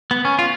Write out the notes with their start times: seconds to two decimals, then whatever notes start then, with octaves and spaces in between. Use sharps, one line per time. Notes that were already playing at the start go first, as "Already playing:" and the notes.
0.11 B3
0.25 C#4
0.39 F4